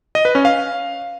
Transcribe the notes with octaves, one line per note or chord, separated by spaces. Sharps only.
D#5
B4
C#4
F5